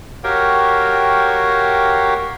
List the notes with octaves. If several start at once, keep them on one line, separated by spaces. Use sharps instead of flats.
F#4 G4 A#4 C#5 F5 G5